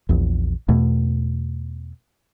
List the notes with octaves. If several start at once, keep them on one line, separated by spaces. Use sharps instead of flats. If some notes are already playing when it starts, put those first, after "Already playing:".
A#1 E2
E2 B2 A3